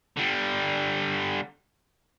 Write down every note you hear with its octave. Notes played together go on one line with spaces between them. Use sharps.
D3 G3